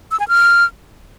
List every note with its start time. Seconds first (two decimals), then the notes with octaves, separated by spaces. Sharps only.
0.11 E6
0.20 G#5
0.28 F6